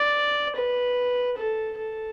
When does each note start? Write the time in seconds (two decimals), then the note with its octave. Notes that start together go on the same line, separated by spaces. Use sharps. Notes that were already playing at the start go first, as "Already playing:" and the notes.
Already playing: D5
0.56 B4
1.37 A4
1.78 A4